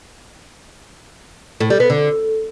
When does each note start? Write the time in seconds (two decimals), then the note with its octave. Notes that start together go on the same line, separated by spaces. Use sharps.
1.60 A2
1.70 G3
1.80 B3
1.90 D3